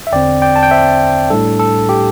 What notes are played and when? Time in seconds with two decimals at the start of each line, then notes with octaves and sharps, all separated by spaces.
0.07 E5
0.12 E2 D3 C4 D5 G5
0.42 D5 G5
0.56 A5
0.63 G5
0.71 C5 E5
1.30 A2 G3 D4 A4
1.59 A4
1.89 G4